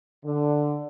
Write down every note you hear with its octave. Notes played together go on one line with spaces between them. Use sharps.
D3